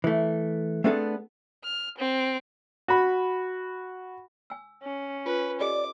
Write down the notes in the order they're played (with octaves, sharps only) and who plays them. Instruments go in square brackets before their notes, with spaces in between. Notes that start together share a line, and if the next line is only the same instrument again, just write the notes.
[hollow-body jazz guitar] E3 A3
A3 B3 C4 D4 G#4 A4
[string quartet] F6
C4
[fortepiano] F#4 B5
[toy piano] G#5 E6
[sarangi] C#4
[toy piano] F4 [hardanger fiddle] B4
[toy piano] G4 A4 D#5 [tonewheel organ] D5 [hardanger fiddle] D6